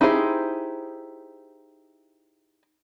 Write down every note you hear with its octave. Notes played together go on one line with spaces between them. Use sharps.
D#4 E4 G4 G#4 C5